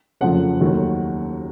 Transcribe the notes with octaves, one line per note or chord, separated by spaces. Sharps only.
F#1 F2 C#3 F3 A3 F#5
D#2 D#3 F#3 A3